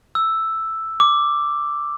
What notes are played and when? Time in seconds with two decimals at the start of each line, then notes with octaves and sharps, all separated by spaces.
0.15 E6
1.00 D6